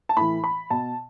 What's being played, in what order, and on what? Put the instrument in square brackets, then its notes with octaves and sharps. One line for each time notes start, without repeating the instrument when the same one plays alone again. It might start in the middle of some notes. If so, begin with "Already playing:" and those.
[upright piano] A5
A2 E3 B5
B5
B2 A5